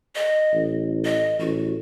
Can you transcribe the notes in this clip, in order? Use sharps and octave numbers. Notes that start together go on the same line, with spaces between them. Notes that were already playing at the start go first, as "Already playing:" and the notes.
D#5
A1
D#5
A1 F#4